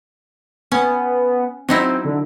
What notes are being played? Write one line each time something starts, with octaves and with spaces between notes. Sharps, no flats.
B3 C#4
F#3 C4 D#4 E4
D3